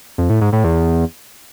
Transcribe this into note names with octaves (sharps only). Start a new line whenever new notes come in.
F2
A2
G#2
A2
E2